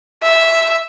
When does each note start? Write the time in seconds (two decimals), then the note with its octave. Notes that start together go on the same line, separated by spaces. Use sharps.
0.23 E5